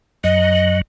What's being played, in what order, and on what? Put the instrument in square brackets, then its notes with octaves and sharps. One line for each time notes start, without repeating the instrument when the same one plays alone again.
[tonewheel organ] F#2 F#3 [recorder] D#5